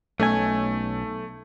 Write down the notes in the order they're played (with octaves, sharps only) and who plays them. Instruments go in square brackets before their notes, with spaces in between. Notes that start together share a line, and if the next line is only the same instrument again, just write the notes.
[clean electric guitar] B1 C#4 G#5 [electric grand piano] A3